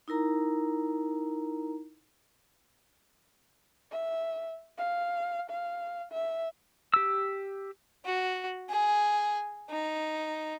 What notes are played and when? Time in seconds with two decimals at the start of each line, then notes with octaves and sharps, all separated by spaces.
0.08 D#4 E4 A#4 A#5
3.91 E5
4.78 F5
5.50 F5
6.12 E5
6.94 G4 E6
8.05 F#4
8.70 G#4
9.70 D#4